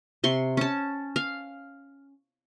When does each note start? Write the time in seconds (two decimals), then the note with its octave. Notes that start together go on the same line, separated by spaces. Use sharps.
0.24 C3 C6 C#6
0.57 C#4 A5
1.16 F5